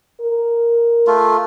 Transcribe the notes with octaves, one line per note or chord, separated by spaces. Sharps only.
A#4
A3 F4